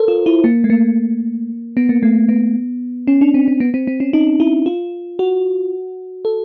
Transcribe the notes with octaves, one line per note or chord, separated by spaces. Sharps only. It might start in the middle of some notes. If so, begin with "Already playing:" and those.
Already playing: A4 A#4 C5
F4
E4
A#3
A3
A#3
B3
A#3
A3
B3
C#4
D4
C4
C4
B3
C4
C4
C#4
D#4
E4
F4
F#4
A4